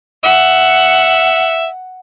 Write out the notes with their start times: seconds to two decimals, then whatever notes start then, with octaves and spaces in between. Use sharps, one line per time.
0.23 E5 F#5